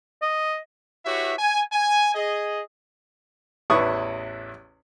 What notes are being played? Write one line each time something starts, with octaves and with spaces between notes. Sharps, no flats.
D#5
E4 F#4 G4 B4 C#5 E5
G#5
G#5
G#4 D#5
A1 E2 E4 B4 C#6 D#6